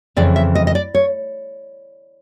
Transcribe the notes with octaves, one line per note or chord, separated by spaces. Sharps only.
F2 C#3 E3 D5
E5
D#5
D#5
D5
C#5